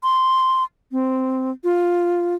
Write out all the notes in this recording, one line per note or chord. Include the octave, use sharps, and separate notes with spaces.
C6
C4
F4